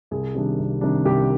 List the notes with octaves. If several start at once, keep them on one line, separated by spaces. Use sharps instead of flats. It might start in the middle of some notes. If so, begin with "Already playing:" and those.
C2 G#4
C3 D#3 G3 D4
C2
C3 D#3 G3 D4
C2 G4